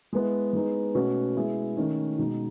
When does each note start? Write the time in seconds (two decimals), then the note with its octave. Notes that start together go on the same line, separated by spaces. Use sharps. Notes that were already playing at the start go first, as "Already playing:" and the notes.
0.13 G#3 B3 E4
0.53 G#3 B3 D#4 G#4
0.94 B2 A3 C#4 F#4 B4
1.36 G#3 B3 E4 G#4
1.77 D#3 A3 C#4
2.18 B2 G#3 D#4